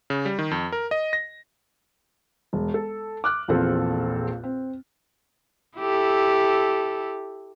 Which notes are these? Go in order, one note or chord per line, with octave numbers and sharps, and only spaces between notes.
C#3
G3
D#3
F2
A#4
D#5
A#6
E1
A4
D6 F6 F#6
A#1 E2 A#2 C4 A4
C4
E4 G4 A4